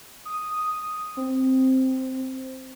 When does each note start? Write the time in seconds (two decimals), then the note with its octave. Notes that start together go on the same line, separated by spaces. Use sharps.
0.25 D#6
0.68 D#6
1.17 C4